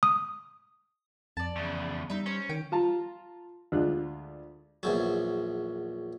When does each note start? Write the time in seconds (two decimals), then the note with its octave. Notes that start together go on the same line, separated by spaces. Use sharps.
0.03 D#6
1.37 F2 D5 A5
1.56 E2 C#3
2.10 G3 D#4 E5
2.26 C#4 C5
2.49 D#3 G5
2.72 F4 A5 A#5
3.72 D2 G#3 D4 F4 F#6
4.83 A#1 E2 F#3